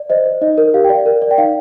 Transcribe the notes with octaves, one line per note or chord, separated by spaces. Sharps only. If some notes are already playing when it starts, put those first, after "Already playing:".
Already playing: D5
C5 D#5
C5
D#4 D#5
A#4
G4 F5
G5
D5
F5
A#4
D5
G5
D#4 F5